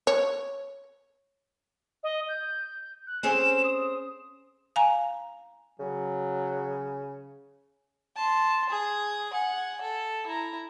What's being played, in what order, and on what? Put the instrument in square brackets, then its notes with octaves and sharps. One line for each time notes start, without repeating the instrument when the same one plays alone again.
[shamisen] C#5
[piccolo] D#5
G6
F#6
[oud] C4 C#4 G#4 [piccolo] E7
[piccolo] D#6
[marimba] F5 G#5 A#5
[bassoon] C#3 [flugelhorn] F#3
[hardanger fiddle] A5 C6
G#4 D#6
F#5 G#5
A4
E4 A#5